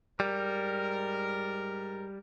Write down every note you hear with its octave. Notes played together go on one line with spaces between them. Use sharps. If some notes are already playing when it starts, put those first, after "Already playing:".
G#2 G3 A#4